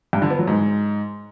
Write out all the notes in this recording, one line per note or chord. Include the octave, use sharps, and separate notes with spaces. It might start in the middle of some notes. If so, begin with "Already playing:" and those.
G2
D3
B3
F#3
G#2